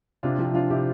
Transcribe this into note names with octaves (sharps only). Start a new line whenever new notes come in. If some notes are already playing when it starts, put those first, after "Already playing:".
C3 D4 F4
F3 E4 G4
F3 D4 F4
C3 E4 G4